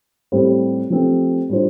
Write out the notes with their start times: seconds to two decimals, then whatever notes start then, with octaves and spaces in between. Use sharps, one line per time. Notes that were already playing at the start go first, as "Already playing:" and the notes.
0.32 A2 G3 C4 G4 C5
0.90 F3 A3 C4 G4
1.49 A2 G3 D4 F4 C5